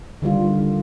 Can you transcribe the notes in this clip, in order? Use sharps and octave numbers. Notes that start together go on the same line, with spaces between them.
D3 D#3 G3 F4